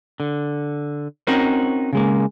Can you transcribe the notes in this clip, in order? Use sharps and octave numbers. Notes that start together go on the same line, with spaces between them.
D3
C4 C#4 D#4 F#4 A#4 C5
C#3 G#3 A#3